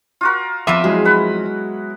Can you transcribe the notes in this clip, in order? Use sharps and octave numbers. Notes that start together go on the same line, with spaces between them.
F4 F#4 A#4
F2 F3 B3 E5 C6 D6 E6 D#7
F#3 G#3 E4 G#4
B4 F#5 B5